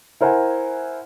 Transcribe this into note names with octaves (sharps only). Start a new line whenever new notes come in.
E4 A#4 C5 F#5 G#5